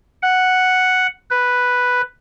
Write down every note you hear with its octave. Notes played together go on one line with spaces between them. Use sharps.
F#5
B4